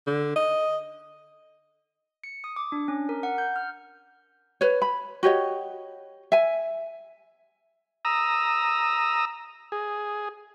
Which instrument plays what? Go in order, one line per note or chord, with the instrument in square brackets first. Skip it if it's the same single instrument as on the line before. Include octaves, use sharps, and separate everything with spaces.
[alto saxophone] D3
D#5
[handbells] C#7
D#6
D6
D4
C#4
A#4
F#5
G6
F6
[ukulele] B4 C#5
B5
F#4 G4 C#5 D#5
E5 G#5
[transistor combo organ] A#5 D#6 E6
G#4